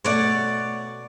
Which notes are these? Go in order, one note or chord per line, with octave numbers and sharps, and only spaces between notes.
B2 A3 C#5 D5 F#5